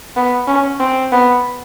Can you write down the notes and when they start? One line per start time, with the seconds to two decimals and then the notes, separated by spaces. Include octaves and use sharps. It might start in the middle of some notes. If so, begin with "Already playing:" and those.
0.16 B3
0.48 C#4
0.80 C4
1.12 B3